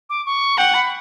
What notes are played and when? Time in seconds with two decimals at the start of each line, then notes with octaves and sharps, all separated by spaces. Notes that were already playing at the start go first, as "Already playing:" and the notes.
0.10 D6
0.26 C#6
0.58 F#5 G5
0.74 B5